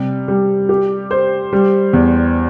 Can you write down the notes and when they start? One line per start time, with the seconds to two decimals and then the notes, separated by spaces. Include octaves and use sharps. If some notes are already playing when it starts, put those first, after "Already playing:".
Already playing: C3 G3
0.28 G3
0.69 G4
1.11 C5
1.53 G3
1.93 E2